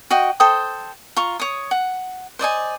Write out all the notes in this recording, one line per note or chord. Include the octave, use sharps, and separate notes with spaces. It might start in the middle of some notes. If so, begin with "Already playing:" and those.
F#4 D#5 G5
A4 C5 G5 D#6
F4 A#5 C#6
C#5 D#6
F#5
C5 D5 D#5 G#5